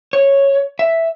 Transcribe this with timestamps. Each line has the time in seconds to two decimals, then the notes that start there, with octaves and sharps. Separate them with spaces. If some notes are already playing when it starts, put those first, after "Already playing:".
0.13 C#5
0.79 E5